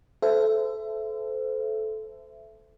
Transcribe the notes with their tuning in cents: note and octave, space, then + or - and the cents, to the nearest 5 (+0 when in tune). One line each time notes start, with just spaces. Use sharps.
A4 -15 C5 -30 E5 +20